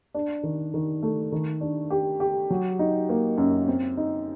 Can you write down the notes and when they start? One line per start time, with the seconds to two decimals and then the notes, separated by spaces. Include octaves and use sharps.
0.14 D4
0.43 D#3
0.74 D#3
1.03 A3
1.32 D#3
1.61 D4
1.90 G4
2.20 G4
2.50 F#3
2.79 D#4
3.09 A#3
3.38 F#2
3.68 C4
3.97 D#4